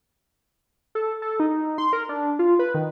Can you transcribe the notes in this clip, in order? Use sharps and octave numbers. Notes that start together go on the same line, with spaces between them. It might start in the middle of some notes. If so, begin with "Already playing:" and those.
A4
A4
D#4
C6
A#4
D4
F4
B4
D#3